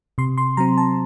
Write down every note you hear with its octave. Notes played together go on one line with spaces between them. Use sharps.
C3 C6
C6
F#3 C4 A#5
A5